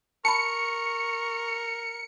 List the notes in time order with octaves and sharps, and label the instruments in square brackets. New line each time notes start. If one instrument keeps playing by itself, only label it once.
[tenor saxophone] A#4 [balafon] A5 B5 [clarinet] C#6 [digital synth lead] C#7